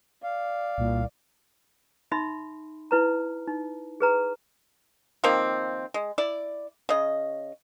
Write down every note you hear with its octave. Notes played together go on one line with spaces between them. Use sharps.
D5 F5
C2 A#2
D#4 E5 B5 C6
E4 B4 A#5
D#4
G#4 B4 A#5
D#3 F3 A#3 C4
G#3
E4 D5
C#3 D#5